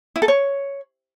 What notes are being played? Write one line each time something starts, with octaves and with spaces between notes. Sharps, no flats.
E4
A4
C#5